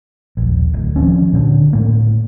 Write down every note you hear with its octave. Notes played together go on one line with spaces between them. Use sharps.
D#1 A#1
D1
D#3 F3 C4 C#4
A#2 D3 D4
A2 A#3